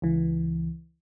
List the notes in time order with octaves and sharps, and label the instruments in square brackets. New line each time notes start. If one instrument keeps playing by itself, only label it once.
[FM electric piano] C#2 E3